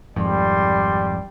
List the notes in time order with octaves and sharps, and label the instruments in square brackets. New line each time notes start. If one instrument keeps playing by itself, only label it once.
[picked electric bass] G#1 F2 G#2 [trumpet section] G3 D5 C6